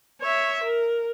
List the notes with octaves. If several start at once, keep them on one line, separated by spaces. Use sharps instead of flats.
C#5 E5
A#4